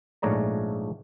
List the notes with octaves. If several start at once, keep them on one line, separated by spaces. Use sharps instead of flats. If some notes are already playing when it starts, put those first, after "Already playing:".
A#1 G#2 A3 C#5 D5 A#5